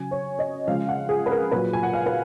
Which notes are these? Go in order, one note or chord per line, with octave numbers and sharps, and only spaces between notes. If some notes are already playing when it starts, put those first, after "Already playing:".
Already playing: C#3 F#3 G#5
C#5
D#5
C#3 F3 G#3 F5
F#5
G#4
B4
A#4
A#2 F#3 B4
G#5
F#5
F5
B4